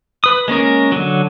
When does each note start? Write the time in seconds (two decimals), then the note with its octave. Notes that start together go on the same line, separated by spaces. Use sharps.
0.24 B4 D#6
0.48 G#3 A#3 C#4 A#4
0.92 D3 F#3